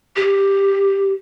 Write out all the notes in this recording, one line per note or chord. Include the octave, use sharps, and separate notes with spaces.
G4